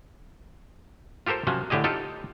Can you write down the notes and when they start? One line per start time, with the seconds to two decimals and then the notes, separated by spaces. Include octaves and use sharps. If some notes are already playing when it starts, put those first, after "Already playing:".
1.26 F4 G4 A4 A#4 C5
1.47 C3 F3 F#3 C#4
1.70 A2 D3 G4 G#4 D#5
1.84 D#4 F4 G4 A4